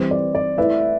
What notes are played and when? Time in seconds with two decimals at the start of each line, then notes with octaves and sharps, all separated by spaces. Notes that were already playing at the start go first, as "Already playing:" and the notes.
Already playing: E3 G3 C4 G4 B4 C5
0.11 D5
0.35 D5
0.58 A3 E4 B4 E5